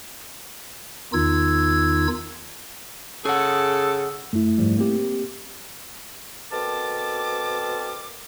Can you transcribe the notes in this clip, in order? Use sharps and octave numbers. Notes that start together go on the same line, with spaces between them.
E2 D#3 D#4 F4 E6 G#6
C#3 G#4 A4 F#5
F#2 A3 E4
G#2 F3 G3
A#3 C4 G4
B2 C4 A4 A#4 A5 D6